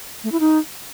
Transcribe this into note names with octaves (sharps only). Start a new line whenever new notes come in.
A3
E4
D#4